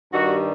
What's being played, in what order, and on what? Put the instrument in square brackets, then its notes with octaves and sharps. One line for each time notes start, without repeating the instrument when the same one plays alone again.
[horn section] G2 D#3 G3 F#4